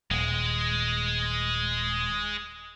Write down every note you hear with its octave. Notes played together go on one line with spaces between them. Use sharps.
D#1 G#3